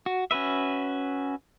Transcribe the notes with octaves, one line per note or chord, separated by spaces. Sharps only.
F#4
C#4 F#4 B4 E5